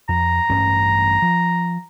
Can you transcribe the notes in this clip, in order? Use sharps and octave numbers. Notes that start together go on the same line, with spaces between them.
F2 A#5
A1 G2 C#4
F3